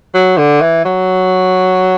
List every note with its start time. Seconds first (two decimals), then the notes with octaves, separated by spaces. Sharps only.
0.14 F#3
0.38 D3
0.61 E3
0.85 F#3